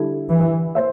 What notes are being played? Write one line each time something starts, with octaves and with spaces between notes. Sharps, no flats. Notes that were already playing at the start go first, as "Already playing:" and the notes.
Already playing: D3 G3 E4 A4
E3
C5 E5